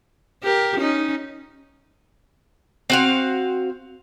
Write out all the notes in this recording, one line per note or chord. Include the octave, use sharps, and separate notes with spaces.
G4 A#4
C#4 D#4
C4 F#4 F5